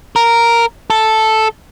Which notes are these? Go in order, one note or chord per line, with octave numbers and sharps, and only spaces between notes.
A#4
A4